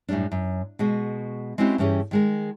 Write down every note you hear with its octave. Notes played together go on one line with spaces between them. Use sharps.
F#2 A2 C#3 G3 D4
F#2
B2 G#3 F#4
G#3 C4 C#4 E4 F#4 G4
G2 E3 C#4 G4 G#4
D#3 G#3 A#4